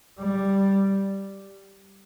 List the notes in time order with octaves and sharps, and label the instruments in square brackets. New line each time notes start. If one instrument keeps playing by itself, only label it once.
[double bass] G3